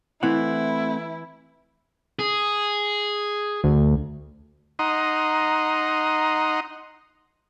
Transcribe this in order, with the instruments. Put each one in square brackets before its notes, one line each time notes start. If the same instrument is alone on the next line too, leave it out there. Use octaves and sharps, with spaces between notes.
[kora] E3 [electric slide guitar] A3 C4 F#5 [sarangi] E4
[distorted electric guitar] G#4
[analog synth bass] D2
[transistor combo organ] D#4 F#5 A#5 C6 D#6